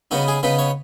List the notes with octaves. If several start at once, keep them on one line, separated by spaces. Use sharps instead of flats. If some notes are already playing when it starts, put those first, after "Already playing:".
C#3 B3 D#4 F#4
G#4
C#3 B3 D#4 B4
C#5